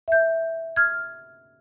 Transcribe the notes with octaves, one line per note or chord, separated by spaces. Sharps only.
E5 G6
F6 G#6